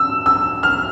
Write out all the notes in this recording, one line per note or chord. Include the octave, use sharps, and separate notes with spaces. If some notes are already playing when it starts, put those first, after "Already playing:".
Already playing: E6
E6
F6